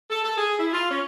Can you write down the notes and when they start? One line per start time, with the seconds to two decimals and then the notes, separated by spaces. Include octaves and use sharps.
0.10 A4
0.24 A4
0.38 G#4
0.59 E4
0.73 F4
0.91 C#4